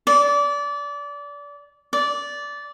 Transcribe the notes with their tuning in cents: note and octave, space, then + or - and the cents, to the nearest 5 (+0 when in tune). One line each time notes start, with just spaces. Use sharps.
D5 -25
D5 -15